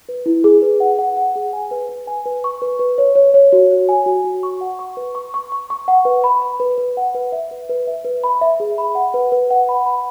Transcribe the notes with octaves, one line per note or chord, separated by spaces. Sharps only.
B4
E4
G#4
B4
F#5
F#5
F#5
G#4
G#5
B4
B4
G#5
B4
C#6
B4
B4
C#5
C#5
C#5
F#4
C#5
G#5
F#4
F#4
C#6
F#5
C#6
B4
C#6
C#6
C#6
C#6
F#5
B4
B5
B5
B4
B4
F#5
B4
E5
B4
B4
E5
B4
B5
E5
G#4
B5
F#5
B4
B4
F#5
B5
B5